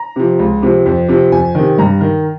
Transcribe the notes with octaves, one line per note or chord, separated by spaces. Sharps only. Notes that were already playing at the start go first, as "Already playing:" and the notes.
Already playing: A#5
C3 F3
C#2
C3 F3
F2
C3 F3
F2 G#5
C3 D#3
G2 A#5
D#3